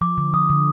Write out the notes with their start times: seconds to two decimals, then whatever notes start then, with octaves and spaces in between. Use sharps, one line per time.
0.01 F3 D6
0.18 D3
0.33 F3 D#6
0.49 D3